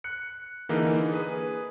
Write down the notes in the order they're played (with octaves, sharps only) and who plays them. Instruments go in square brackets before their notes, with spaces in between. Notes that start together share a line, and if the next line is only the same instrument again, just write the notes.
[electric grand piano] F#6 C#7
D3 E3 A#3 D#4 G#4 A#4
G#4 B4 D#6